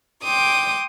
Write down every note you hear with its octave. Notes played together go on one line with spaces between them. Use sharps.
G5 C6 D6 D#6